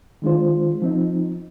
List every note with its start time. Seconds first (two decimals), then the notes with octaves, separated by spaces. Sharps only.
0.22 D#3 G#3 D4 F4 C5
0.82 F3 C4 D#4